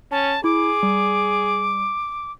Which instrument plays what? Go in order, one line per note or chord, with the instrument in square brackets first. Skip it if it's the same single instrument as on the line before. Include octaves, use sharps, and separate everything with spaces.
[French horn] C#4 [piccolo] A5
[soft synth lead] E4 [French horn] G#4 [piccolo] D6
[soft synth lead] G3